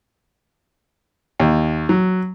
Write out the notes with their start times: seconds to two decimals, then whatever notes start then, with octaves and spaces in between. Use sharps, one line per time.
1.40 D#2
1.89 F#3